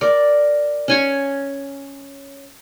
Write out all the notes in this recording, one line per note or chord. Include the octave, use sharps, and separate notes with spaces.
A#4 D5
C#4 G#5 C#6